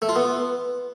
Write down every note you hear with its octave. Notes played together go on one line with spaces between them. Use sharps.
A3
F4
B3